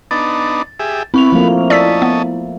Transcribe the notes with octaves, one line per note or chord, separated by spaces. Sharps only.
B3 D4 D#4 A6
G4 G#4 E5
B3 C4 E4 C#6 F7
F3 A3 A#3
C#4 E4 A4 D5 D#5 E6 B6
B3